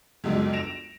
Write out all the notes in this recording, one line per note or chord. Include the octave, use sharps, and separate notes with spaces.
G1 C#2 F#2 G#3
A#6 D7 E7 F7